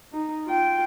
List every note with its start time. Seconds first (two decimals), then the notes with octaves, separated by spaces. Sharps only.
0.12 D#4
0.46 F4 G5